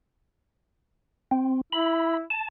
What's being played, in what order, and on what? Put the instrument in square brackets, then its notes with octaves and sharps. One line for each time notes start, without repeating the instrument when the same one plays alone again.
[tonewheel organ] C4
[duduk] E4 [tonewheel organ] B5
[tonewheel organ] A5